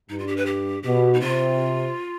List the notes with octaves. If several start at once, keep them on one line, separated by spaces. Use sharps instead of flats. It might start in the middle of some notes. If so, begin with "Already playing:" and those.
G2 D#4
F4
G4
B4
G4
B2 G4
D#4
C3 F4